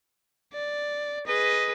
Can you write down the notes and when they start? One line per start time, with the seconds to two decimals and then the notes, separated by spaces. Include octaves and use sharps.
0.53 D5
1.27 G#4 B4 D#5